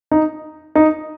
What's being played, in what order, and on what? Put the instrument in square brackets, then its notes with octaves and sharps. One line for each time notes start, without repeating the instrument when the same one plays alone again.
[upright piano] D#4
D#4